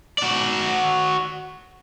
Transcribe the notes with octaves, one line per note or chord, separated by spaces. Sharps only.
F#4 D5